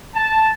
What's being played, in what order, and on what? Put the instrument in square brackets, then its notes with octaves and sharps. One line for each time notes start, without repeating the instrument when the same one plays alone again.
[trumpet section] A5